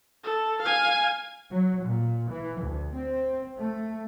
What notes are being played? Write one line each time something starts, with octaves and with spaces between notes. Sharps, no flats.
A4
F5 G#5
F#3
A#2
E3
D2
C4
A3